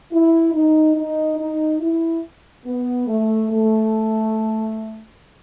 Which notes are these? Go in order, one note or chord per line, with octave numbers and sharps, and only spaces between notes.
E4
D#4
D#4
D#4
E4
B3
A3
A3